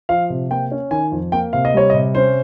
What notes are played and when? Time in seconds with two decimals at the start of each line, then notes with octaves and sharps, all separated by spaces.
0.09 F3 F5
0.30 C3
0.51 A#3 G5
0.72 C#4
0.91 D#3 G#5
1.12 F2
1.32 A#3 G5
1.53 C3 F5
1.65 D#5
1.74 G3 C#5
1.90 D#5
1.94 C3
2.15 C#4 C5